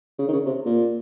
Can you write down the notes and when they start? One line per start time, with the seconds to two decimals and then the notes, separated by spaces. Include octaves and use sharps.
0.19 C#3
0.28 D#3
0.33 C#3
0.46 C3
0.66 A#2